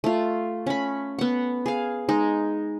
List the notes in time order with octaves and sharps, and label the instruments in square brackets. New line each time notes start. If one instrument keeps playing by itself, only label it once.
[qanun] A3 F4
C#4 B5
B3 F#5
G#4 F5
G#3 D#4